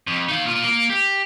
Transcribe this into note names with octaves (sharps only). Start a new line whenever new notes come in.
F2
D#4 F5
A#2 F4
A#3
G4